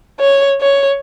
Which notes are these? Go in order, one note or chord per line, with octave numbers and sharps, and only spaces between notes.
C#5
C#5